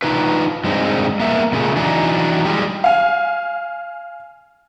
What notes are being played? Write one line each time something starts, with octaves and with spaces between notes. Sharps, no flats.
D4 D#4 F4 B4
G2 G#3 C4 D#4
A#3 B3 E5
A#2 C#3 G#3 A3
E3 F#3 D4 D#4
G3 G#3 G4
F5 G#5